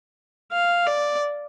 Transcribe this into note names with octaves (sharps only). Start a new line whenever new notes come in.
F5
D5